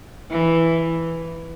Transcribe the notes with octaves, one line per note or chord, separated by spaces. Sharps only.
E3